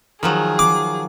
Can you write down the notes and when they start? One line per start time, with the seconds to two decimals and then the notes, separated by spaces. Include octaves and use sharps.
0.23 D#3 F3 F#3 G#4
0.59 D6